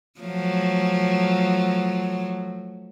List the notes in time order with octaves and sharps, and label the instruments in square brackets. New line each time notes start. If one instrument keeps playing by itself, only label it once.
[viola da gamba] F3 F#3 A3